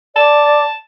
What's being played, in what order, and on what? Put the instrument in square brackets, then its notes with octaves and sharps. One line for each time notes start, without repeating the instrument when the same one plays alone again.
[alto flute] D5 [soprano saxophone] A5